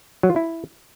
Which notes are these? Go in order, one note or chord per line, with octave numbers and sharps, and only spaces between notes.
F#3
F4
E4